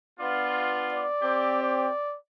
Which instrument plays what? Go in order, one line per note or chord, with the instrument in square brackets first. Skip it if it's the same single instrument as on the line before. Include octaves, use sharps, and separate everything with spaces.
[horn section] B3 D4 F4
[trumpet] D5
[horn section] C4 G4
[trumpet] D5